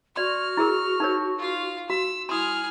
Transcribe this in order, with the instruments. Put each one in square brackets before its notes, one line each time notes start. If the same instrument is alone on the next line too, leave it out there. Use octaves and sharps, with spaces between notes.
[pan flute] F#4 [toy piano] D5 C6 [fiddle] F6
[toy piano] E4 G#4 A#4
D#4 A#4 C#5
[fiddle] F4 F5
[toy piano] F#4 [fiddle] E6
[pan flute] E4 [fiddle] G#4 F6 [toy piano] C6 D#6